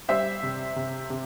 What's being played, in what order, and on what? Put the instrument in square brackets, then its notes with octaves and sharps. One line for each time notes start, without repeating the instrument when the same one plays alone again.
[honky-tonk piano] G3 [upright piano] C5 E5
[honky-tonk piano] C3
C3
C3